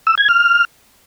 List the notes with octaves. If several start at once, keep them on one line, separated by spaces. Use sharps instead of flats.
E6
G#6
F6